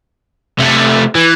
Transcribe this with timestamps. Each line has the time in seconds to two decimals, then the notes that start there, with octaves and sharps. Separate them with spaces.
0.59 C3 A3
1.15 E3